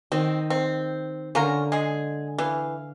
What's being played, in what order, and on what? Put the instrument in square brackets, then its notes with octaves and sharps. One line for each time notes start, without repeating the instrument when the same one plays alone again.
[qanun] D#3 D#5 [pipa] C4
[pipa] C4
[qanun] D3 [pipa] C#4 F4 A#4
[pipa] G#3 G#4
[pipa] E3 [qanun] F5